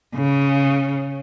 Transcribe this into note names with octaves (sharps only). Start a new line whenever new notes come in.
C#3